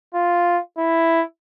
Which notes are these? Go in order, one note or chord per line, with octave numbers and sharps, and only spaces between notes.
F4
E4